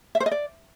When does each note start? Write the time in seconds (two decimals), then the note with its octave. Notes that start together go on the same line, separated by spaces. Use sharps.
0.15 E5
0.20 C5
0.26 D#5
0.31 D5